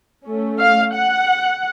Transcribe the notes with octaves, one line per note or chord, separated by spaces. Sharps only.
A3 C#4
F5
F#5